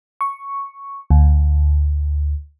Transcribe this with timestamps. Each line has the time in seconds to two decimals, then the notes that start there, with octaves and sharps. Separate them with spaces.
0.21 C#6
1.10 D2